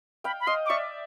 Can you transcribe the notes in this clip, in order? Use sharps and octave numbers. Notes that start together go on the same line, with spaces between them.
F5 G5 B5
B5
D#5 F5 C6
D6
D5 E5 C#6